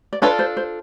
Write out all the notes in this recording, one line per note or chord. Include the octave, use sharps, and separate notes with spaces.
D5
D4 F4 A4 B4 C#5
C5
C5